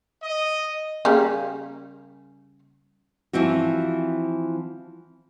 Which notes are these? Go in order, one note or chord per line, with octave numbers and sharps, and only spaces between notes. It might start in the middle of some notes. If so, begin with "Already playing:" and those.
D#5
C#3 G3 A#3
E3 F3 C4 F#4